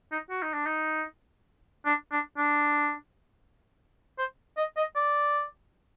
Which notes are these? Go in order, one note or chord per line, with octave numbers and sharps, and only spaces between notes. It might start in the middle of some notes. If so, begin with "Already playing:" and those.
D#4
F#4
D#4
D4
D#4
D4
D4
D4
C5
D#5
D#5
D5